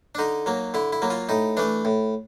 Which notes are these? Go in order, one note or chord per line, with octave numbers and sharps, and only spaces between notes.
D4
D3 D#4
F#3 A#3
D3 E4
E4
F#3 A#3
F4
A2 D#4
E3 A3 D4
A2